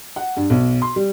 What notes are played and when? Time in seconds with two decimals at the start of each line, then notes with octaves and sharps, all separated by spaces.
0.16 F#5
0.37 G2
0.50 B1
0.82 C6
0.96 G3